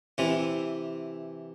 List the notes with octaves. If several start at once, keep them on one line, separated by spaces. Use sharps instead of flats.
C3 E3